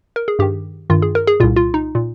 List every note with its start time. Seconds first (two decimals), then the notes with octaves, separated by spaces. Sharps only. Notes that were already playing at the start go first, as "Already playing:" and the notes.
0.16 A#4
0.28 G#4
0.39 G2 D#3 G4
0.90 G2 D#3 F4
1.02 G#4
1.15 A#4
1.27 G#4
1.40 A#2 F4
1.43 C2
1.56 F4
1.74 D#4
1.95 A#2